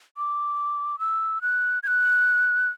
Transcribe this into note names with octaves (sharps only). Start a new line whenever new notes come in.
D6
E6
F#6
G#6
F#6